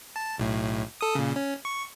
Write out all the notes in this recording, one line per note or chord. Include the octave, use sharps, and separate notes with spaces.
A5
B1 A2
A4 D#6
A#2 C#3
C#4
C#6